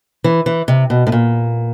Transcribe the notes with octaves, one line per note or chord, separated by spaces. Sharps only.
E3
E3
C3
B2
A2
A#2